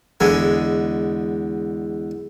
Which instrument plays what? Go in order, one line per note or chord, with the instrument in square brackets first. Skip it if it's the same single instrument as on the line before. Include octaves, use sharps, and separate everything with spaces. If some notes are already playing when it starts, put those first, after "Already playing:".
[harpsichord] E2 D3 G#3 G#5